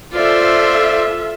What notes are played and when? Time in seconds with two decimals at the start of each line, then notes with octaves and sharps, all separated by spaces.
0.14 F4 A4 C5 D5 E5